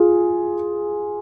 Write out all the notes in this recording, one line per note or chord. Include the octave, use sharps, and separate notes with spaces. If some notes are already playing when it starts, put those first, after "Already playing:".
Already playing: F4 G#4